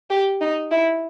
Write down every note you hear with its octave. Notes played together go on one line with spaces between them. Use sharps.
G4
D#4
E4